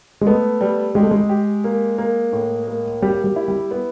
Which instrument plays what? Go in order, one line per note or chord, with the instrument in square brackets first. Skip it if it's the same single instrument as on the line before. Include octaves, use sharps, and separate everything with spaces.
[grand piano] G#3
[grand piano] A3 [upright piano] B3
[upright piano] G3
[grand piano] G#3 [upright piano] G4
[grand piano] A3
G#3
[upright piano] G4
A#3
A#3
A2
A#3
[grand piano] G3 [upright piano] G4
[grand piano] G3
[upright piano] E4
[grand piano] G3
[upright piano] B3